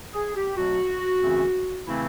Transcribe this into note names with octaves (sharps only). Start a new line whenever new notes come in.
G#4
G4
B2 F#3 A3 C4 F#4
F#2 C#3 E3 A3 C4
C#3 E3 A3 C4 E4